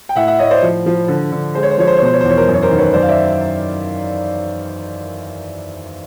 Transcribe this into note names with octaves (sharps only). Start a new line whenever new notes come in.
G5
A2 E5 F#5
E5 F#5
A2 C#5 D#5
C5 D5
F3
F3
D3
D3
G#3 C5
C#5
C5
F3 C#5
C5
C#5
B2 C5
C#5
C5
E2
C#5
A#4 C5
F#2
C#5
A#4 C5
D#3
B4 C#5
F#2 C5 D5
F5
D5 E5